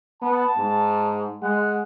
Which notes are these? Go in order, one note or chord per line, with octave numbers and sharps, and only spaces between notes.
B3 A5
G#2
G#3 F#5